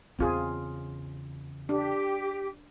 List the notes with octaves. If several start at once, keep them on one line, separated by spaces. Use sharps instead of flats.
E2 C#3 C4 F4 G#4
D4 G4